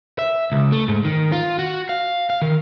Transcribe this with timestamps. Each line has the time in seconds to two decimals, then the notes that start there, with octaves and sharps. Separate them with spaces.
0.19 E5
0.52 C#2
0.72 A3
0.88 G#2
1.05 D#3
1.32 F4
1.59 F#4
1.89 F5
2.30 F5
2.42 D#3